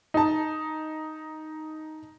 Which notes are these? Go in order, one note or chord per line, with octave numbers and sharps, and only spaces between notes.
D#4 A5